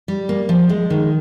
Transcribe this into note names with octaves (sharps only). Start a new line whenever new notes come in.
G3
A#3
F3
G#3
D#3